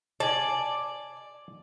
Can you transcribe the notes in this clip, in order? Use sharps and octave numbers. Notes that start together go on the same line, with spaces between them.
D5 G#5 A5